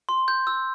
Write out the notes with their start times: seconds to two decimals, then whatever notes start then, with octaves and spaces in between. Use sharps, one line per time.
0.09 C6
0.28 G6
0.47 E6